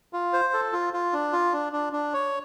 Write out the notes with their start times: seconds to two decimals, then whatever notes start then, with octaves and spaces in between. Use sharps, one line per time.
0.13 F4
0.33 C5
0.54 A4
0.73 F4
0.93 F4
1.13 D4
1.33 F4
1.53 D4
1.73 D4
1.93 D4
2.14 C#5